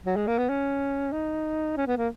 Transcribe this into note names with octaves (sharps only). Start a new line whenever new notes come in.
F#3
G#3
A#3
B3
C#4
D#4
C#4
B3
A#3